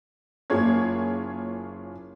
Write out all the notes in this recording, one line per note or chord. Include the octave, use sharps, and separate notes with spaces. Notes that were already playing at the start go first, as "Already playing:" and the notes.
F#1 A#3 F4 G#4 C#5 G#6